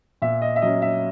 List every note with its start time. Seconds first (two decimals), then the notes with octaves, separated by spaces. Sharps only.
0.22 A#2 E5
0.42 D#5
0.56 E5
0.62 F#3 C#4 D#5
0.82 E5